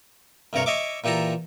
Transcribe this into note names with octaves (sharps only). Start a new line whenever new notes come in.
D2 G2 C3 A#4 C#5
C#5 D#5 E5 D6
A#2 E3 G4 A4 A#5